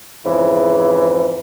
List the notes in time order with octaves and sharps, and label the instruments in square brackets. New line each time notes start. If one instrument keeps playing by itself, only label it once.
[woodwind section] F2 G#2 C#3 E3